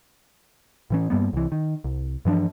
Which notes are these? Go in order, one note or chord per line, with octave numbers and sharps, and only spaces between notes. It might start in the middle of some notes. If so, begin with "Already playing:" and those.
A2 E3 C#4
G2 G3 A#3 B3
C2 E3
D#3
C2
G2 E3 F3 D4